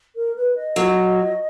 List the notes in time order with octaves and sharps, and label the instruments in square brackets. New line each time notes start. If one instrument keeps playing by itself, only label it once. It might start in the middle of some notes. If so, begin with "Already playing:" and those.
[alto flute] A#4
B4
D#5
[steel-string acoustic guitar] F#3